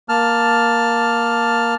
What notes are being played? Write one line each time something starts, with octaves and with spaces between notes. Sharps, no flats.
A#3 A5 F6